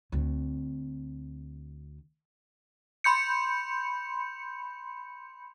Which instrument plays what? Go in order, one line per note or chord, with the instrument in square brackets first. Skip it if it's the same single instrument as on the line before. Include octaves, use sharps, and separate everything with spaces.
[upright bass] D2 C4
[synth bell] B5 C6 G6 C#7